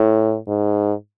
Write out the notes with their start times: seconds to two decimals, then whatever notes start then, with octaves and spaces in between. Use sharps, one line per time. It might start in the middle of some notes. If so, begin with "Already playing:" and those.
Already playing: A2
0.48 G#2